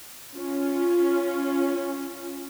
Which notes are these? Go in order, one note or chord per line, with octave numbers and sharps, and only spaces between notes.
C#4 F4